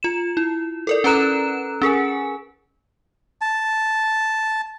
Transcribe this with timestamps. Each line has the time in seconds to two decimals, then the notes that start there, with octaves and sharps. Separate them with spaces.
0.03 F4 E7
0.37 E4
0.87 A4 A#4 D5
1.04 C#4 A4 B4 A#5 F#6 E7
1.82 C#4 G#4 A#4 G#5
3.41 A5